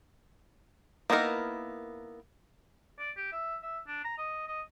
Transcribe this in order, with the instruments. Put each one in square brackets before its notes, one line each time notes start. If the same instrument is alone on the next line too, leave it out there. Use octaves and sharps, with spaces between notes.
[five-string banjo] A#3 B3 D#4 E4 A#4
[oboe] D5
G4
E5
E5
D4
A#5
D#5
D#5